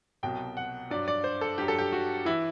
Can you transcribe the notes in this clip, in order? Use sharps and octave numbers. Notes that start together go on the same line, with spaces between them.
C2 B2 F#3 G5
F#5
G2 F#3 D5
D5
C5
A4
G2 F#3 G4
A4
G4
F#4
E3 E4